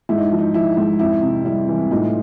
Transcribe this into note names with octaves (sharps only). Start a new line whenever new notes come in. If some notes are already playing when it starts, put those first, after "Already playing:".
G#2 E4
D#4
F3
D#4
F3 E4
G#2
F2 E4
C3
G3 E4
E3
A2 D#4 F4